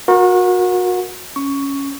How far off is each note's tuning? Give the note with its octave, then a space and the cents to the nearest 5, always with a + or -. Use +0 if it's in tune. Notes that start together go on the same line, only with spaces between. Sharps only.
F#4 -30 A#4 +20
C#4 +0 C#6 +10